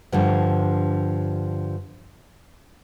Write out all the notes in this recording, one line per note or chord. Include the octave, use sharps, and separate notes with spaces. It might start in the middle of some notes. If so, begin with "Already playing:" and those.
G2 D3 F3